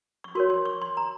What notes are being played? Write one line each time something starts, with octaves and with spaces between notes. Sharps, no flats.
C#6
F#4 A#4 C#5 C6
C6
C#6
C6
A#5